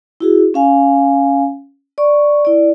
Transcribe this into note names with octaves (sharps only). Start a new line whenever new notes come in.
E4 F#4 G#4
C#4 F5 G#5
D5 C#6
E4 D5